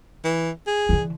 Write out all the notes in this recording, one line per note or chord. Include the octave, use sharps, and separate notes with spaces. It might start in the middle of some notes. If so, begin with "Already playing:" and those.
E3
G#4
D3 E3